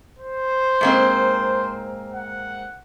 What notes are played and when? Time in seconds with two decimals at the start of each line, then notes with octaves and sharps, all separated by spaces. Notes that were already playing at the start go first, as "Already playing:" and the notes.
0.18 C5
0.81 G#2 A#3 C4
2.13 F#5